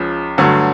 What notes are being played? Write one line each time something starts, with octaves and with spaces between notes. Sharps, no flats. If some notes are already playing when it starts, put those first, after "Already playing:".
Already playing: C#2 C#3 F3
G2 D3 F#3 A3